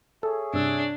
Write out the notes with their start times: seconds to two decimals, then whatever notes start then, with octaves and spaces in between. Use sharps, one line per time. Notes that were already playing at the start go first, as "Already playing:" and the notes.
0.23 G#4 A4 C#5 E5
0.54 G2 C3 D4 E6